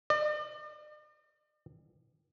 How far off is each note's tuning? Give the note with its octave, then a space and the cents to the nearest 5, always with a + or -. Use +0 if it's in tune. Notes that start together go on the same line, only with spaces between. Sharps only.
D5 +45